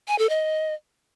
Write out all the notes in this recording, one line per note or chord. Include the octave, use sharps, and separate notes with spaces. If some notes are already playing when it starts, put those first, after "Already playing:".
G#5
A4
D#5